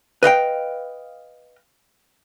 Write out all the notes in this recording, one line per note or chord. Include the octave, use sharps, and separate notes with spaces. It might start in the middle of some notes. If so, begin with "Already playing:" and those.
B4 D#5 F5 G5